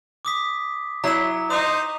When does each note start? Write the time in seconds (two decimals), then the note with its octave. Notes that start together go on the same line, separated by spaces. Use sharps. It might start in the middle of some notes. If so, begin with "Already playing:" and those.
0.25 D6 D#6 B6
1.04 F#3 E4 A#5 E7
1.50 D#4 C5 D#6 F7